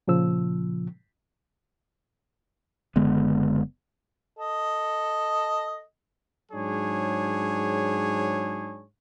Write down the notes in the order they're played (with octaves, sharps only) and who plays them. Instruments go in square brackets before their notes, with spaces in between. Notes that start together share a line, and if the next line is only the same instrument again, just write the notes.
[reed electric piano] A#2 C#3 F3 E6
[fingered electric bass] F#1 D3 G#3 B3
[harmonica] A4 D#5
[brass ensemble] G#2 F#3 D4 G#4 C#5